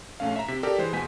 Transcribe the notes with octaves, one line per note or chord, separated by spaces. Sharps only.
A#1 A3 C#4 F5
E5 A#5
C3 B6
G4 A4 A#4 D5
E3 G#3 C5
D#2 B2 G#3 G#5 G6 B6